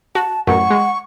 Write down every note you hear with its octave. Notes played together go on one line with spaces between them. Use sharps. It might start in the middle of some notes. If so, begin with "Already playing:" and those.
F#4 A5
A1 F#2 F#5 C#6
G#3